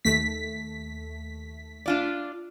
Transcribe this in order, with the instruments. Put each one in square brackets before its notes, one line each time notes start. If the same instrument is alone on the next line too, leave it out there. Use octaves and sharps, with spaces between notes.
[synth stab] D#2 A3 B6
[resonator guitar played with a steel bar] D4 F4 D5